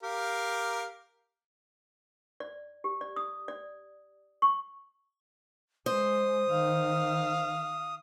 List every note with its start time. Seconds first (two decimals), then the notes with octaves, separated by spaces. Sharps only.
0.03 G4 A#4 F5
2.40 D5
2.84 G4
3.01 D5
3.16 D#6
3.48 D5
4.42 C#6
5.86 G#3 C5 D#6
6.50 D#3 F5